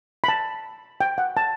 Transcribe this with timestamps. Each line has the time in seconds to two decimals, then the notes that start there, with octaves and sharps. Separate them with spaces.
0.24 B5
0.28 A5
1.01 G5
1.18 F#5
1.37 A5